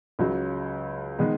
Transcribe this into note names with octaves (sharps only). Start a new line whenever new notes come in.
C#2 C#3 F#3
D#3 G#3 B3 D#4